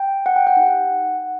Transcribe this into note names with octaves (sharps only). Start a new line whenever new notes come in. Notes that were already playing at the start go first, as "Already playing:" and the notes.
Already playing: G5
F#5
G5
F#5
D#4 G4